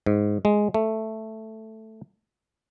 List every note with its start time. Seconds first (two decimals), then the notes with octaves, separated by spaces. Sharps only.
0.06 G#2
0.45 G#3
0.74 A3